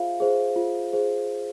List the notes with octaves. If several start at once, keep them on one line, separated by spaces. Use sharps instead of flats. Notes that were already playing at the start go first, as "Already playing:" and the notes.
Already playing: F4 G#4 C5 E5 F5
G#4 C5
F4
G#4 C5